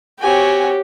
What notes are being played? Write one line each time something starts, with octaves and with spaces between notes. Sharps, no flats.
C4 F#4 G4 C#5 G#5